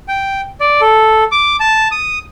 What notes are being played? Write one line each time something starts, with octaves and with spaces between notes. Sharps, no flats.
G5
D5
A4
D6
A5
D#6